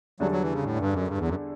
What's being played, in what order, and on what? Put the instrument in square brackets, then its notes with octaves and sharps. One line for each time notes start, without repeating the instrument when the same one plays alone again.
[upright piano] E2 D3 G3 D4 A4 [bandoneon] F#3
[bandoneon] F#3
E3
C#3
A2
G2
F#2
G2
E2
F#2